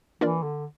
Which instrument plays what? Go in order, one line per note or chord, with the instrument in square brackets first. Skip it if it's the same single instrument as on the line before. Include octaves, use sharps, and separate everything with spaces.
[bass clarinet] E3 [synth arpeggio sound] A#3 D4 F4 A#4 D5
[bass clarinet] D3